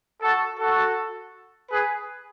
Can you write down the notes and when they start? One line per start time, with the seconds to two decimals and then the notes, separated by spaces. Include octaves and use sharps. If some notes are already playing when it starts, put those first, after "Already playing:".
0.22 F#4 A4
0.60 F#4 A4
1.71 G#4 B4